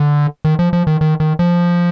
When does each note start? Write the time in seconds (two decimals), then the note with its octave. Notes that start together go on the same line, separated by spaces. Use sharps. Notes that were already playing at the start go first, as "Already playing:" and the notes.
Already playing: D3
0.45 D#3
0.59 F3
0.73 F3
0.87 D#3
1.01 D#3
1.20 D#3
1.39 F3